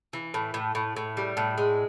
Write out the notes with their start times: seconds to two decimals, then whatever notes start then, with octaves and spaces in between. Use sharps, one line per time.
0.13 E3
0.34 A2
0.54 A2
0.75 A2
0.96 A2
1.17 G3
1.37 A2
1.58 G#3